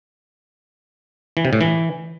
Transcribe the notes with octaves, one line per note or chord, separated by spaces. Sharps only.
E3
C3
A2
E3